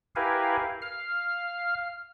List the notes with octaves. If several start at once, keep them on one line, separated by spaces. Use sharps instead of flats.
E4 G4 A#4 B4 F5 G#5
F5 F6